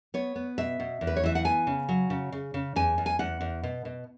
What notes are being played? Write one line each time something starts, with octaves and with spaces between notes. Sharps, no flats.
B3 C#5
B3
B2 E5
B2
E2
B4
C#5
E3 E5
F#5
B3 G#5
C#3
F#3
C#3
C#3
C#3
E2 G#5
E2
G#5
E2 F#5
E2
B2
B2